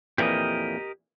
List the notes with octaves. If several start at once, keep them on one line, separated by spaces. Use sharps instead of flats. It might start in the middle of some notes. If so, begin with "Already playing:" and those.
F2 A#2 E3 G4 A#4 D#5